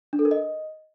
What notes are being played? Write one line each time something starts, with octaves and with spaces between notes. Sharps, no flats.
D4
A4
A#4
D#5